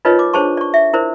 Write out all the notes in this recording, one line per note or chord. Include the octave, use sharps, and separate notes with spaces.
D#4 F4 A#4 B4 C#5 D#5
D6
D4 G#4 C5 C#5 A5 C#6
D5 C#6
E5
E4 A#4 C5 D5